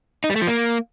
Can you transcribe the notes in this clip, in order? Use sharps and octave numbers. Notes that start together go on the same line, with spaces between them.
D#4
G3
A3
F3
A#3